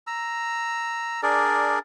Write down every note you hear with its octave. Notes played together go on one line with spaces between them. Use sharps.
A#5 E6
D4 G#4 A#4 D5